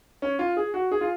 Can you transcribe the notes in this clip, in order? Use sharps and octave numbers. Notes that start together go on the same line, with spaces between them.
C#4
F4
G#4
F#4
G#4
F4